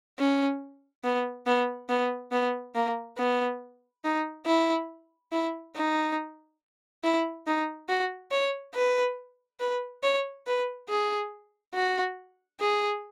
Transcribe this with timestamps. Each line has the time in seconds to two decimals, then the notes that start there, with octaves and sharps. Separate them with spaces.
0.19 C#4
1.04 B3
1.46 B3
1.89 B3
2.32 B3
2.75 A#3
3.18 B3
4.04 D#4
4.46 E4
5.32 E4
5.76 D#4
7.04 E4
7.47 D#4
7.89 F#4
8.31 C#5
8.75 B4
9.60 B4
10.03 C#5
10.47 B4
10.89 G#4
11.74 F#4
12.60 G#4